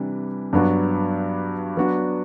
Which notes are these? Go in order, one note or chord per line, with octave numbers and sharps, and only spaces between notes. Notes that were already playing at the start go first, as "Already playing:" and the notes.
Already playing: C3 E3 G3 D4
G2 F#3 B3 D4 F#4
F#3 B3 D4 F#4